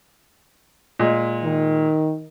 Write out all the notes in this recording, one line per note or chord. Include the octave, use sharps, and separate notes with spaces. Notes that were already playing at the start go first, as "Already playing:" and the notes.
A#2 G#3
D#3